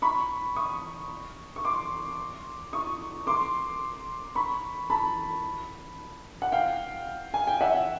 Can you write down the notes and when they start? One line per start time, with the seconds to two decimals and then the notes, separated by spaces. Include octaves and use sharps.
0.02 B5 C#6
0.56 C#6 D#6
1.56 C#6
1.65 C6 D6
2.73 C#6 D#6
3.27 C6 D6
4.35 B5 C#6
4.90 A5 B5
6.42 F#5
6.52 F5 G5
7.34 G#5
7.47 G5
7.61 E5 F#5